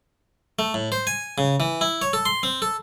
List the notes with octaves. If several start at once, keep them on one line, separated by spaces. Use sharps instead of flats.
A3
A2
C5
G#5
C#3
E3
E4
C#5
A4
C6
C4
A4